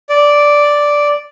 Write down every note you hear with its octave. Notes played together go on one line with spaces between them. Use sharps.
D5